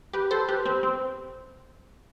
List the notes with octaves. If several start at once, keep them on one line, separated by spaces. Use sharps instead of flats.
G4 B4
A4 C5
G4 B4
C4
C4